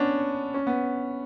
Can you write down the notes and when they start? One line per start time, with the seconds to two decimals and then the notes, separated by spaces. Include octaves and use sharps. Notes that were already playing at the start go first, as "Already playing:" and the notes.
Already playing: B3 C#4 D4
0.54 C#4
0.67 B3